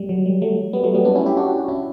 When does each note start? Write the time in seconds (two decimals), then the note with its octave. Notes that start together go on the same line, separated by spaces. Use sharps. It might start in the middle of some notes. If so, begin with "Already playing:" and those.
Already playing: G3
0.09 F#3
0.26 G3
0.42 F#3 A3
0.73 G3 B3
0.84 F#3 A3
0.94 G3 B3
1.05 B3 D4
1.15 C#4 E4
1.26 E4 G4
1.37 D4 F#4
1.57 F#4
1.68 C#4 E4